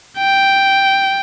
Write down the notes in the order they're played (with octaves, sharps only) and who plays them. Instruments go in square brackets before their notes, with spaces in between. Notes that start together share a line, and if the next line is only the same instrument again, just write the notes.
[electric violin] G5